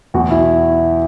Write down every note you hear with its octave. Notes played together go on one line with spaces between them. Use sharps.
E2 B2 F#3 F#4
E4